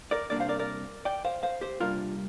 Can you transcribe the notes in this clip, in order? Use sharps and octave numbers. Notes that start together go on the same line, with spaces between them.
A#4 D5
C2 C3 G3 A#3 D4 A#4 D5
C5 F5
A#4 D5
A#4 D5
D5 G5
C5 F5
C5 F5
G4 C5
C3 G3 A#3 D4 F4 A#4